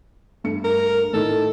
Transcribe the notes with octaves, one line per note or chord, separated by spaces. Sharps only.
G2 A3 C#7
A#4
A2 D#3 A4